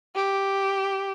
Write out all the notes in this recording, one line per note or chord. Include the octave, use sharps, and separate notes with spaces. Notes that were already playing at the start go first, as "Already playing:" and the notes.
G4